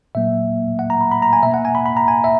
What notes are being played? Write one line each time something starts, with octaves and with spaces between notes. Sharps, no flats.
A#2 F#3 A#3 E5
F#5
A#5
B5
B5
A#5
G#5
B2 A#3 E5
F#5
G#5
B5
B5
A#5
G#5
E5